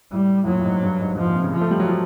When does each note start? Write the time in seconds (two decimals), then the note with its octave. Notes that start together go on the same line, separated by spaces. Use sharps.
0.12 A2 G3
0.44 A2
0.47 A#2 F#3
0.59 A2
0.65 G#2
0.83 G2
1.00 G#2
1.17 G#2 F3
1.27 A#2
1.35 C3
1.44 C#3
1.53 F3
1.61 A3
1.71 G3
1.80 F#3
1.88 F3